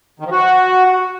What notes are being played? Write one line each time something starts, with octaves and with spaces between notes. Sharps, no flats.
D#3
F3
F#4